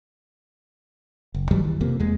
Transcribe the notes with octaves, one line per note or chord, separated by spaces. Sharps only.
F#1
G2 D#3 F#3 G3
E3
E1 F2 C3 A#3
E2 G#3